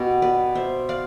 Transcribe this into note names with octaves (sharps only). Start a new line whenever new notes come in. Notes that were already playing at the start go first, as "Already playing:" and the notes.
Already playing: B2 B3 G4
B4 D5
C5 E5
D5 F5